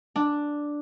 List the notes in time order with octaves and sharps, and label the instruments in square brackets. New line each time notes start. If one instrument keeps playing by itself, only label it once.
[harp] D4